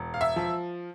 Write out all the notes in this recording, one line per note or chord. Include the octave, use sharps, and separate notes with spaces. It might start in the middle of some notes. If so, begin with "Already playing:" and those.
Already playing: E1
F5
E5
F3